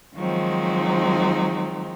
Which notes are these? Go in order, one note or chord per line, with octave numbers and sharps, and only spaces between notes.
D#3 F3 F#3 G#3 C4 D#4